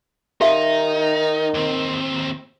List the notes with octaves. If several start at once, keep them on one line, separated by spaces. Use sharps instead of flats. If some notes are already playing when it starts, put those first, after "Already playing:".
D#3 D#4 G4 E5 F5
D#2 C4